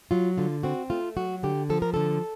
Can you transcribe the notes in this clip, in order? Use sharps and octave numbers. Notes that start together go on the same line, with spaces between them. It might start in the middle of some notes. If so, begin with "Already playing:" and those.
F#3 F4
D3 F4
C4 F#4
A3 F4
F#3 F#4
D3 G4
F3 A4
A#4
D3 A4